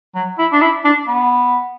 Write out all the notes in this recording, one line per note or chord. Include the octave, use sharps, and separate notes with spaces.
F#3
E4
D4
E4
D4
B3